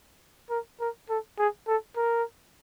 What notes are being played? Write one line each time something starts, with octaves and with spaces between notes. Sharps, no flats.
A#4
A#4
A4
G#4
A4
A#4